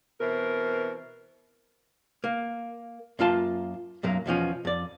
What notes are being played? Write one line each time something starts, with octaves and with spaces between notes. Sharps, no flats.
B2 E3 C4 A#4
A#3
F#2 A#3 F4 A5 C6
B1 F#2 F#3 A#3
E2 B2 F3 C#4
F2 D5